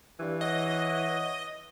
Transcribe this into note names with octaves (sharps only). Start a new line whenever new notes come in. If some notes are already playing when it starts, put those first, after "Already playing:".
G2 E3
C#5 D#5 E5 F#5